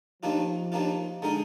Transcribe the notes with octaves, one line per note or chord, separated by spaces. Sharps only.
D#2 D#3 F3 A#3 D4 F4
D#2 D#3 A#3 D4 F4
D3 G#3 D#4 A#4